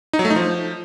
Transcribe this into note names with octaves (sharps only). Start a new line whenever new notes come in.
D#4
F#3
A3
D#4
F3